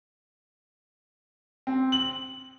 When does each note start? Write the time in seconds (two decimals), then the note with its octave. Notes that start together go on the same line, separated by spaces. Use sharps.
1.67 C4
1.92 F#7